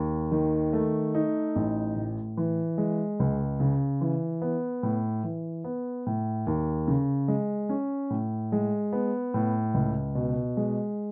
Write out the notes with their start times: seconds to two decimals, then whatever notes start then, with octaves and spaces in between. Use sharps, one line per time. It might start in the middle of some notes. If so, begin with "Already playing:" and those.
Already playing: D#2
0.32 D#3
0.73 A3
1.14 D#4
1.56 A1
1.96 A2
2.37 E3
2.78 G#3
3.20 C#2
3.60 C#3
4.01 E3
4.42 B3
4.83 A2
5.23 E3
5.64 B3
6.06 A2
6.47 D#2
6.87 C#3
7.28 G#3
7.69 C#4
8.10 A2
8.52 G#3
8.93 B3
9.34 A2
9.74 C#2
10.15 B2
10.57 G#3